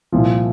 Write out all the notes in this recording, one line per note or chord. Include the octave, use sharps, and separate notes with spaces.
C2 A#2 F3